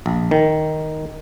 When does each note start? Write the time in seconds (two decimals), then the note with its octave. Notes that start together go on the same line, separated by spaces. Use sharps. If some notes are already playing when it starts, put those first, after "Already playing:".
0.06 A#1
0.31 D#3